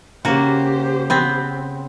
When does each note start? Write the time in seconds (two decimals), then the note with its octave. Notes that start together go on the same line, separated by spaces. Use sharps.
0.25 C#3 A#3 F#4 G4 C5
1.10 B3 C4